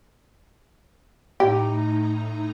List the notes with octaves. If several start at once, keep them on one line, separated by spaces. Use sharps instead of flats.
A2 D#4 G4 A#5